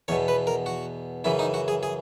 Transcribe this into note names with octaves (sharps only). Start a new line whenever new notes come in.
E2 B2 C#5
B4
A#4
F#4
F#2 C#3 E3 E4
D#4
F#4
G#4
G#4